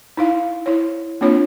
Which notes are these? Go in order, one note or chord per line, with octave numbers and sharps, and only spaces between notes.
D#4 E4 F5
E4 C#5
A#3 C4 D4 F4 C#5